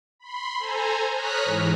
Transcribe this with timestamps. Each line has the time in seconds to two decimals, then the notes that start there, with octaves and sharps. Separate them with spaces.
0.19 B5 C6
0.59 A4 C5 G#5 A#5
1.13 C#5 A#5 D#6 F6 F#6 B6
1.45 G#2 E3